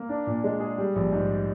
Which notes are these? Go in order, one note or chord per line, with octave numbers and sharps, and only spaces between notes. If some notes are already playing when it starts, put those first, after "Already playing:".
Already playing: A#3
D4
A#2
G#3
G#4
G3
A#1
G#2